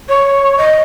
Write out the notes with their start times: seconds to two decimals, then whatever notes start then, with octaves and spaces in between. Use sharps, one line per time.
0.09 C#5
0.58 D#5